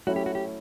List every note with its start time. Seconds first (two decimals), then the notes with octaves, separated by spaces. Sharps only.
0.07 F#3 A3 C#4 E4 F#4
0.16 G4
0.26 F#4
0.35 G4